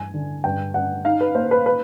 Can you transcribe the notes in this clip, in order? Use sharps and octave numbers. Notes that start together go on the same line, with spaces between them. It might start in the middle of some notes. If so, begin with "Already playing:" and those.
Already playing: G2 E3 G#5
D3
G2 G5
G2 F#5
D#4 F5
B4
A#3 C5
B4
B4